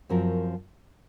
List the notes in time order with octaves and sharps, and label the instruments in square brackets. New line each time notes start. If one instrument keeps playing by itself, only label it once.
[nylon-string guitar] F#2 F3 C4 F#4 A#4